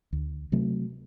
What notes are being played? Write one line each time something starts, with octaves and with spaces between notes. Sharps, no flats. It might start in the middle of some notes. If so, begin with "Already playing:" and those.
D2
C3 F#3 A3